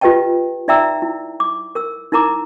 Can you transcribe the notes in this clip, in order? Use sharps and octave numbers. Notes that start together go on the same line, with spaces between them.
F4 G4 B4 D#5 G5 A5
D#4 D5 E5 G5 A#5 E6
E4
D6
A#4 E6
D#4 E4 A#4 A#5 D6